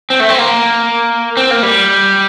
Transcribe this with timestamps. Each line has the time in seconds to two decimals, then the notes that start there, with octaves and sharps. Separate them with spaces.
0.10 C4
0.20 A3
0.29 C4
0.39 A#3
1.37 C4
1.51 A#3
1.63 G3